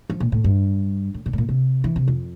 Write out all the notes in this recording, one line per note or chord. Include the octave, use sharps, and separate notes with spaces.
F3
A#2
A2
G2
A2
A#2
A2
A#2
C3
E3
C3
F2